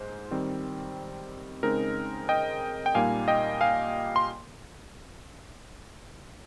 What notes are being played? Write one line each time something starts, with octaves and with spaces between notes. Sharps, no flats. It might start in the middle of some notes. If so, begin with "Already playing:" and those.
Already playing: G#2 G#3 C5
D#3 G3 C4
C#3 G#3 C4 D#4 A#4
D#5 G5
G5
A#2 G3 A#3 D#4 F5 G#5
D#5 G5
F5 G#5
C6